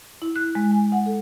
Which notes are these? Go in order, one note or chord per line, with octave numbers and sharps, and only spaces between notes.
E4
F#6
G#3
G#5
F#5
A4